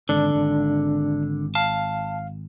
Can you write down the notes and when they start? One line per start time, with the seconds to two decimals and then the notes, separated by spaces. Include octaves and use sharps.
0.09 G#1 D3 D4 D5
0.35 G#1
1.55 F5 A5